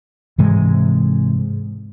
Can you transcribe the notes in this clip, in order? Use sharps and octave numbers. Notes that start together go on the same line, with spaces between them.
G#2 C3 E3 G#3